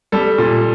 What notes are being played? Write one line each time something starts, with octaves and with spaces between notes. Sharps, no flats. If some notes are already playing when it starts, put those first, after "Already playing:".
G3 A4
A#2